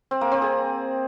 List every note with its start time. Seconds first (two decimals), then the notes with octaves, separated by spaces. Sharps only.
0.11 C4
0.21 A#3
0.31 C4
0.42 G#4